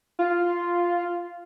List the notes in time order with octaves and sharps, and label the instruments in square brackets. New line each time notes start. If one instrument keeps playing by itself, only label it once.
[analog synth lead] F4